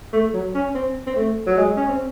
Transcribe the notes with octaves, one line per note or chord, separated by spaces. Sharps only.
A3
F#3
C#4
C4
C4
A3
F#3
G#3
C#4
C4